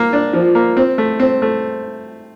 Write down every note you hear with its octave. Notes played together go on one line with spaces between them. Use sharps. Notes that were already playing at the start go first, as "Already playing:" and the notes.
Already playing: A#3
D4
F3
A#3
C4
A3
C4
A3